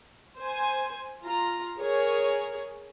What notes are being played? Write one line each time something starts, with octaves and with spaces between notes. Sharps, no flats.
C5 G#5
F4 A#5
G#4 A#4 C#5